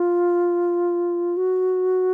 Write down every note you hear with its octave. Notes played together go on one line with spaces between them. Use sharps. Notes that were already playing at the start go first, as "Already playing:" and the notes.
Already playing: F4
F#4